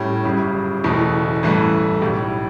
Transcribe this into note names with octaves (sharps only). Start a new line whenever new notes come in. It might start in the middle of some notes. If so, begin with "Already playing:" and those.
Already playing: A2 G3 C#4
G1 F#2 C#3 G3
F#1 E2 B2 A3
A1 G2 E3 A3
B1 A2 G3